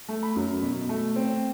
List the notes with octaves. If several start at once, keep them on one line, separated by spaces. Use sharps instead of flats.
A3
B5
F#2
B2
A3
C4